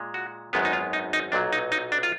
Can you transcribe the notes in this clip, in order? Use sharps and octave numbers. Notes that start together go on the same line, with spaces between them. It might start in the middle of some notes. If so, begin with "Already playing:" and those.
Already playing: A#2 G#3
F#4
G#1 F#2 D#3 G#3 B3 F4
D#4
F4
D#4
D#4
B1 A#2 F#3 D4
D#4
D#4
D4
F4